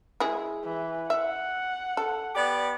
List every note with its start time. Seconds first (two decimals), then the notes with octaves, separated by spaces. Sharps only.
0.20 G#3 E4 G#4
0.64 E3
1.10 E5 F#5
1.97 A4
2.34 B3 G4 D5